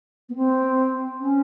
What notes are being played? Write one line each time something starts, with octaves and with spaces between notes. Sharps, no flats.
B3
C4
C#4